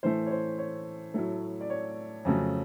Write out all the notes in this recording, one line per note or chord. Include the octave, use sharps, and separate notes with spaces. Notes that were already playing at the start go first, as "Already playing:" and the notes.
A2 E3 A3 C5
C#5
C5
C#5
A2 F#3 A3
D5
C#5
F2 C#3 F#3 A3